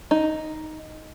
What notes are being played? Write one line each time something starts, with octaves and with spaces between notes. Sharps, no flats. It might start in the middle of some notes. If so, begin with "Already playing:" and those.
D#4